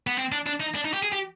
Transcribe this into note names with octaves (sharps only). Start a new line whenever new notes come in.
B3
C4
D4
D4
D#4
D4
D#4
G4
G#4
G4